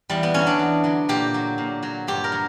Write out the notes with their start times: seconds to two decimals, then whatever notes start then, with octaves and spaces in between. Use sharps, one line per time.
0.10 E2 G3
0.23 B3
0.34 D3 F#3 C#4
0.47 D4
0.59 E2
0.84 D3 F#3
1.09 A#2 G4
1.34 F#3
1.58 A#2
1.83 F#3
2.08 G2 G4
2.24 A#4
2.32 F#3